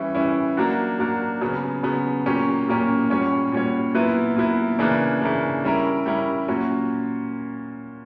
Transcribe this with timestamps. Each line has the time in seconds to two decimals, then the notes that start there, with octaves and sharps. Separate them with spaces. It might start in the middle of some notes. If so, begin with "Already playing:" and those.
Already playing: E3 G3 C#4 E4
0.15 E3 G3 C#4 E4
0.57 F#3 A#3 D4 F#4
0.99 F#3 A#3 D4 F#4
1.41 C#3 F#3 B3
1.83 C#3 F#3 B3
2.26 A#2 F#3 A#3 C#4 G4
2.68 A#2 F#3 A#3 C#4 G4
3.10 A#2 G3 C#4 F#4 C#5
3.52 A#2 G3 C#4 F#4 C#5
3.94 A#2 F#3 B3 E4 B4
4.36 A#2 F#3 B3 E4 B4
4.79 C#3 E3 A#3 D4
5.21 C#3 E3 A#3 D4
5.64 G3 C#4 E4 A#4
6.06 G3 C#4 E4 A#4
6.48 A#2 F#3 C#4 F#4